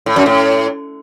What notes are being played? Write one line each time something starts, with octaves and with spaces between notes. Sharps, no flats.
A2
F#2
A2